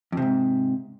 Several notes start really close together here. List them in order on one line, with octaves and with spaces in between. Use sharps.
F2 C3 G#2